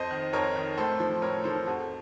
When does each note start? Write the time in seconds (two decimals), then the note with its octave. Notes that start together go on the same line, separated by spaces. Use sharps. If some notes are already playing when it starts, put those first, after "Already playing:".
Already playing: F2 C5 D#5
0.11 D#3
0.33 F2 A#4 C#5
0.56 D#3
0.78 A2 A4 C5
1.00 F3
1.22 A2 A#4 C#5
1.44 F3 A4 C5
1.66 F2 F#4